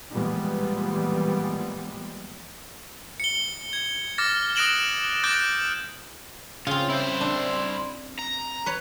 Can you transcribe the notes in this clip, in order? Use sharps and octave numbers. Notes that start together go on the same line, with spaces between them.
A#2 E3 F3 G3 G#3 B3
C#7 G7
G#6
D6 F6 A6 A#6
D#6 F#6 A#6 D7 E7 F#7
D6 F#6 G6 A6 A#6 D7
C#3 C4 F4
E4 C5
D4
A#5
B4 C#5